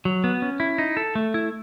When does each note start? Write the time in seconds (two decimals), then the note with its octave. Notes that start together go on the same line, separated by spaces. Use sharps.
0.05 F#3
0.24 B3
0.42 C#4
0.60 E4
0.78 D#4
0.97 A4
1.15 A3
1.34 E4